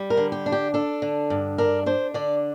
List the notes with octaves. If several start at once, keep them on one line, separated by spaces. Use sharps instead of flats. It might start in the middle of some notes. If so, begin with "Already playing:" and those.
Already playing: G3
A#4
D3
G4
D4
G4
D4 A4
D3
G2
D4 A#4
D4 C5
D3 D5